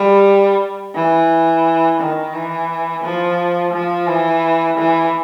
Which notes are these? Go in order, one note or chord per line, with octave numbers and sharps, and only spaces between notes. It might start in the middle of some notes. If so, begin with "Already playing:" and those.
Already playing: G3
E3
D#3
E3
F3
F3
E3
E3